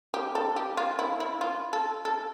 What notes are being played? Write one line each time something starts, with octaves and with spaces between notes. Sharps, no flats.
G4
A4
G4
F4
E4
E4
F4
A4
A4